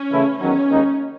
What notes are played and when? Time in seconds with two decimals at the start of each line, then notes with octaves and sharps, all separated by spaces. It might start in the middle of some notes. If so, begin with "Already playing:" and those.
Already playing: C#4
0.11 C#3 E3 A3 E4
0.40 E2 D#3 F#3 C#4
0.69 D#2 D#3 G#3 D#4